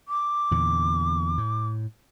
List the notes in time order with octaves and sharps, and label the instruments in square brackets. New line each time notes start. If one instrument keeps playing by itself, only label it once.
[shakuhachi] D6
[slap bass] E2 A#2 D3
A2